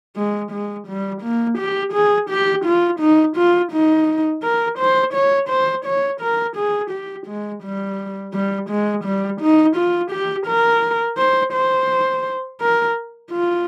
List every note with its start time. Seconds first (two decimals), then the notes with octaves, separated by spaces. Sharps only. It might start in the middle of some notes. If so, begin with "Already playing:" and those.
0.17 G#3
0.52 G#3
0.88 G3
1.22 A#3
1.58 G4
1.93 G#4
2.30 G4
2.65 F4
3.00 D#4
3.37 F4
3.72 D#4
4.43 A#4
4.79 C5
5.14 C#5
5.50 C5
5.86 C#5
6.21 A#4
6.57 G#4
6.91 G4
7.27 G#3
7.63 G3
8.34 G3
8.70 G#3
9.05 G3
9.41 D#4
9.77 F4
10.12 G4
10.47 A#4
11.18 C5
11.53 C5
12.61 A#4
13.32 F4